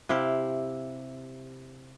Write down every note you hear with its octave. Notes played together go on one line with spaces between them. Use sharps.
C3 E4 G4 F5